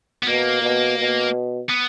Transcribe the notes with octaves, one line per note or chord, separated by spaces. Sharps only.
B3
B2 A#3
B2
B2
B3